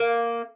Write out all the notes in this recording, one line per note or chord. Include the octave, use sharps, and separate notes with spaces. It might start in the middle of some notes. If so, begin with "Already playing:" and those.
Already playing: A#3